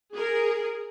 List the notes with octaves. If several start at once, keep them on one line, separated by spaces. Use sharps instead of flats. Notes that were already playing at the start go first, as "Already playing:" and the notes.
G#4 A#4